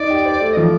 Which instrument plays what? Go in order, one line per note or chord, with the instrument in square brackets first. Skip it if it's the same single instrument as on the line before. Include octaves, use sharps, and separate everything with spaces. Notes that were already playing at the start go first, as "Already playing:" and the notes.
Already playing: [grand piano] D#4 [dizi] D5
[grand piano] G4
C5
A3
[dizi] D#5
[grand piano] F3 [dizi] D5